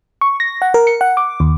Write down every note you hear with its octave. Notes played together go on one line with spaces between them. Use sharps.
C#6
A#6
F#5
A#4
C#7
F#5
D6
D#2